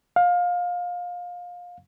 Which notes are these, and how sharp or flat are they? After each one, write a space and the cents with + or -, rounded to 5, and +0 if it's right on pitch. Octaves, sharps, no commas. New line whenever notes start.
F5 +25